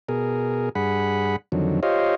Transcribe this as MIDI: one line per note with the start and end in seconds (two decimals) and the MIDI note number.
0.09 0.69 47
0.09 0.69 68
0.09 0.69 70
0.75 1.36 43
0.75 1.36 68
0.75 1.36 78
0.75 1.36 83
1.52 1.80 41
1.52 1.80 50
1.52 1.80 51
1.52 1.80 54
1.83 2.15 65
1.83 2.15 67
1.83 2.15 72
1.83 2.15 73
1.83 2.15 75
1.83 2.15 77